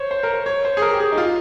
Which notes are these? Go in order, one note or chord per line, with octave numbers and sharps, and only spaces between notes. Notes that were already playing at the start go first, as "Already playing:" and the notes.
Already playing: C5 C#5
C5
A#4
C5
C#5
C5
G#4
A#4
G4
G#4
D#4
F4